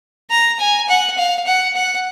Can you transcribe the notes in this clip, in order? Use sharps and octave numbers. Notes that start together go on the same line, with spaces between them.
A#5
G#5
F#5
F5
F#5
F#5